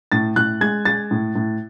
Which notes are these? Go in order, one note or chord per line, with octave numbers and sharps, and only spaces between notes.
A2 A6
A2 F#6
G#3 G#6
G#3 A6
A2
A2